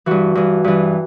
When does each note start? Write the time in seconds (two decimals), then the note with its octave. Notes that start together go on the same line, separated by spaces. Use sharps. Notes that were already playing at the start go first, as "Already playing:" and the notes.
0.06 G2 E3 F#4
0.35 G2 E3
0.64 G2 E3